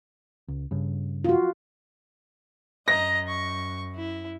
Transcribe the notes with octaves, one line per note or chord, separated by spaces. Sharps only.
C#2
G2 C#3
F4 F#4
F#2 D#5 A#5 A#6
C#6
E4